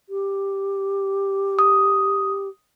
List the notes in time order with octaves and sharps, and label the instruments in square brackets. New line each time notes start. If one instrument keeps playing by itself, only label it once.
[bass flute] G4
[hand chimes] D#6